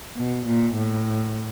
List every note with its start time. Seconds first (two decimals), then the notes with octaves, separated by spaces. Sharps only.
0.15 B2
0.45 A#2
0.75 A2